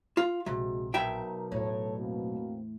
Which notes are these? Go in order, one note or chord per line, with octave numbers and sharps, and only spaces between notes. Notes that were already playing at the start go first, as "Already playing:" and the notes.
F4
A#1 C3 G#3 F#4
B1 A#4 E5 G5
E2 A2 A4 C#5
B2 A#3 C4